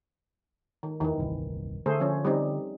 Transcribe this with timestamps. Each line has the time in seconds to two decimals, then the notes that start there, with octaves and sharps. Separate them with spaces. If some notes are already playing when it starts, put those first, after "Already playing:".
0.83 D#3
1.01 E2 D#3 E3
1.18 D#1 C2 G2
1.86 D3 A3 G#4 C5
2.00 F3 C#4
2.25 G3 C4 D#4